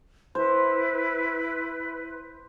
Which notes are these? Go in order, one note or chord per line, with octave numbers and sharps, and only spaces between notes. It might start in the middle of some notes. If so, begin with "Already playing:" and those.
E4 B4 C5